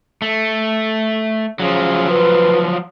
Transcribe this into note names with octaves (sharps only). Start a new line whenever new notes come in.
A3
C#3 F3 F#3
B4